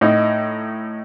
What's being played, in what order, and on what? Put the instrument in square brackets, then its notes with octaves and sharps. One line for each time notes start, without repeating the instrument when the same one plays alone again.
[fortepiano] A2 D#4